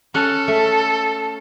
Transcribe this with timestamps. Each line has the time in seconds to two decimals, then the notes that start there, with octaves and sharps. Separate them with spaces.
0.14 C#4 A4 F#5
0.48 A3